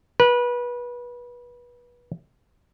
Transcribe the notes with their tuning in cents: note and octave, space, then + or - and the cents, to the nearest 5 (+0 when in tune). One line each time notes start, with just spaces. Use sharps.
B4 -25